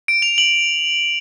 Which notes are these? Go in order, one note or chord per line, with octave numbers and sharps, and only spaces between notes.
D7
F7
F#7